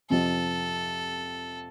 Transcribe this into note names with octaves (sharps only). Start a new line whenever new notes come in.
F2 C3 F3 A4